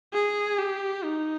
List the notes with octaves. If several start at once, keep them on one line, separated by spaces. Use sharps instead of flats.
G#4
G4
D#4